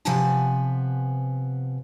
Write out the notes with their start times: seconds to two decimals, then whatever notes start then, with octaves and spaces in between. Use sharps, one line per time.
0.05 C3 F3 B3 B4 G#5 A5